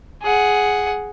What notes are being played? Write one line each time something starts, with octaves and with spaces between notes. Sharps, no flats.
G#4 F#5